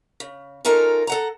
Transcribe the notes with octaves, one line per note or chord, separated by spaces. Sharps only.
C#3
C#4 D#4 F4 A4 A#4
A4 F#5 A#5